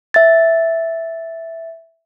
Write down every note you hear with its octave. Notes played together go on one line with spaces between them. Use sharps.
E5 A6